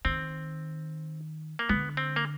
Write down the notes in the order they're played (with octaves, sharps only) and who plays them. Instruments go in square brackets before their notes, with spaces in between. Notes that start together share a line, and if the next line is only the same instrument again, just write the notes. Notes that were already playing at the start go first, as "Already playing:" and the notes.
[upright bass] D#3 [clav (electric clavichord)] C4
[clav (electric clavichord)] A#3
[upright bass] D3 [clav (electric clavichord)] B3
[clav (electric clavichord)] C4
A#3